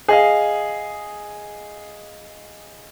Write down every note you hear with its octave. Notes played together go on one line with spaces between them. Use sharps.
G#4 D#5 F5